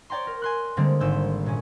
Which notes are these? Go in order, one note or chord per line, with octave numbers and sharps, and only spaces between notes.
C#5 D5 G5 A#5 C6
A#4
G#5 C6 F#6
D3 G3 G#3 A#3 C4
G#1 E6 G6
A#2 G#3 C#4